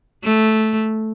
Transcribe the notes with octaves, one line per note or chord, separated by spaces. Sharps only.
A3